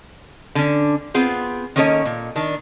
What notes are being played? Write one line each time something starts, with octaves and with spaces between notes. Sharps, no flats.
D3 C#4
B3 C4 F4 G#4
D#3 A#3 C#4 A4 C#5 D#5
A#2
D#3 D4